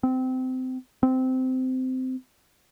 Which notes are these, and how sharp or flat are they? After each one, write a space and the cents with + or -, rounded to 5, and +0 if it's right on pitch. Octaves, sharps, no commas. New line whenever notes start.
C4 -25
C4 -20